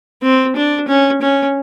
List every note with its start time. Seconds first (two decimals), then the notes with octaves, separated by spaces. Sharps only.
0.22 C4
0.56 D4
0.88 C#4
1.21 C#4